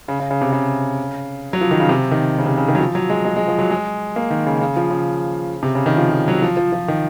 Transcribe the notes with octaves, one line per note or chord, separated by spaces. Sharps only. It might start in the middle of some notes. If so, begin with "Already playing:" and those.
C#3
C#3
C#3
C3
C#3
F#3
F3
D#3
C#3
C3
D#3
C#3
C3
C#3
D#3
F#3
F3
F#3
G#3
G#3
G#3
F3
F#3
G#3
A#3
D#3
C#3
C#3
F3
C#3
C3
C#3
D#3
F3
F3
F#3
F3
F3
F3
D#3